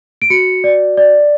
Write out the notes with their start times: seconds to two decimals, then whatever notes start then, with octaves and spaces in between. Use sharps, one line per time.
0.22 D7
0.30 F#4 C#7
0.64 D5
0.97 D5